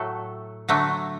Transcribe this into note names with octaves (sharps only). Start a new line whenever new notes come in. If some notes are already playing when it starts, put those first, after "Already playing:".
Already playing: A2 F#3 A3 A4
D3 F#3 A3